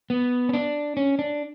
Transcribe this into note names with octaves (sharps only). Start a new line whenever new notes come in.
B3
C#4
D4
C#4
D4